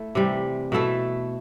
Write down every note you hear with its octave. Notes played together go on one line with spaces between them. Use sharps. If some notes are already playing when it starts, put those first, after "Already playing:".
Already playing: A3 E4
C3 E3 G3
B2 A3 E4 A4